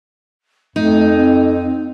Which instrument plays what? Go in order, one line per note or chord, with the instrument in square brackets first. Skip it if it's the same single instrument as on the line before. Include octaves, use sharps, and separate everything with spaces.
[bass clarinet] F2 [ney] A3 [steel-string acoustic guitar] D#4
[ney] C4